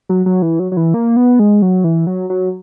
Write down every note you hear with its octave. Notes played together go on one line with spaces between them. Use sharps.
F#3
F#3
E3
F#3
F#3
E3
A#3
B3
G#3
F#3
E3
F#3
F#3